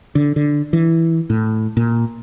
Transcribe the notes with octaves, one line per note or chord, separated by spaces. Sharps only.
D3
D3
E3
A2
A#2